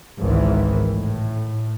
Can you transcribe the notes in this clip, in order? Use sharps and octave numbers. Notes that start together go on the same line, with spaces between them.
G#1 C#2 G#2 D#3 E3
A2